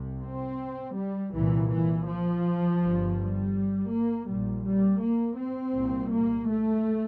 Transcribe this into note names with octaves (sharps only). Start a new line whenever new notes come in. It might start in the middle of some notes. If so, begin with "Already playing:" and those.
Already playing: C2 C3
C4
G3
C2 A#2 E3
E3
F3
G1 G2
G3
A#3
A#1 A#2 G3
G3
A#3
C4
C2 A#2
A#3
A3